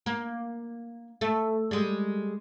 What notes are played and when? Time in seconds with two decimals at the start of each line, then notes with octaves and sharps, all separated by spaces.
0.06 A#3
1.21 A3
1.71 G3 G#3